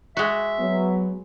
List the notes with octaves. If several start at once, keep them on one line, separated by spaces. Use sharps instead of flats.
G#3 F#4 E5
F#3 B3